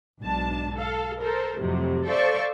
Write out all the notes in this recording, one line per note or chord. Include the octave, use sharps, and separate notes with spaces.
B1 G#2 D4 A5
A4 F5
A4 A#4 C5
F2 A2 C3 F#3
A4 C5 D5 E5 F5 C#6